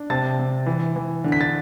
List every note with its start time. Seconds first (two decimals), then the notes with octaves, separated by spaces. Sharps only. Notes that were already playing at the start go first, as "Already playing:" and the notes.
Already playing: D4
0.10 C3 A5 A6
0.39 C3
0.66 E3
0.96 E3
1.24 D3
1.32 B6
1.41 A6